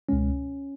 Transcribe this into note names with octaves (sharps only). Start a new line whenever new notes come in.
C#2 B2 G#3 C#4